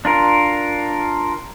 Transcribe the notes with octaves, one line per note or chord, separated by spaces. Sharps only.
D4 F4 A#4